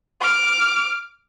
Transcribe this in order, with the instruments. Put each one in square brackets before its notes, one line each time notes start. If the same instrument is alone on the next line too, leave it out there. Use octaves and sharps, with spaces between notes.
[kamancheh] D6 F6